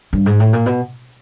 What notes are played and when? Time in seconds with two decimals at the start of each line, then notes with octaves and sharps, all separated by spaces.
0.13 G2
0.26 G#2
0.40 A2
0.53 A#2
0.66 B2